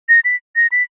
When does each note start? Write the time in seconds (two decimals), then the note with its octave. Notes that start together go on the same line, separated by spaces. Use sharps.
0.09 A#6
0.25 B6
0.56 A#6
0.72 B6